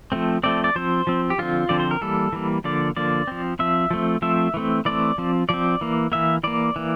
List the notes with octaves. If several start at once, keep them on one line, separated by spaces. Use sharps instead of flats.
F3 A3 C4
F3 A3 C4 D5
D5
F3 C4 C5
F3 C4
G4
D3 F3 C4 F4
D3 F3 C4 D5
C5
A#4
E3 G3 A#3 A4
E3 G3 A#3
D3 F3 A#3 D5
D3 F3 A#3 D5
F3 C4
F3 C4 E5
F3 A3 C4
F3 A3 C4 E5
E3 A3 C4
E3 A3 C4 D5
F3 C4
F3 C4 D5
E3 A#3
E3 A#3 E5
E3 A#3 D5
E3 A#3